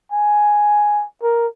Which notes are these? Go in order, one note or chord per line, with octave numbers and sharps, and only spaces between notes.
G#5
A#4